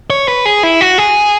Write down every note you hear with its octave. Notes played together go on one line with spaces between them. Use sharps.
C#5
B4
G#4
E4
F#4
G#4